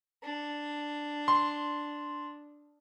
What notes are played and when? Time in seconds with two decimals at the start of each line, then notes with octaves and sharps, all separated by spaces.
0.23 D4
1.28 C6